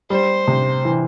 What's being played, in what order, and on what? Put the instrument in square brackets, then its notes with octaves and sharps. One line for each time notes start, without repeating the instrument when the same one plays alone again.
[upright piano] G3 [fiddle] C5
[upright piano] C3
E3